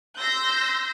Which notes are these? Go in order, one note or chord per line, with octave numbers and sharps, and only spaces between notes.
C6 E6 G6 A#6